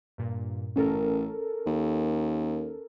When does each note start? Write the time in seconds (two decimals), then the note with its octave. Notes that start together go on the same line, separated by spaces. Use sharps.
0.18 G2 A#2
0.76 A1 C#4 A4 A#4
1.66 D#2